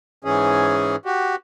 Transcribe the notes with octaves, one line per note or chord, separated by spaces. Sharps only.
G#2 E3 C#4 G#4
F#4 G4